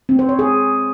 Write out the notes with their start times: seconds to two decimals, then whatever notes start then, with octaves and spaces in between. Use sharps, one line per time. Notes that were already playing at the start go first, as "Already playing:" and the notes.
0.09 C4
0.19 C5
0.29 C#5
0.39 G#4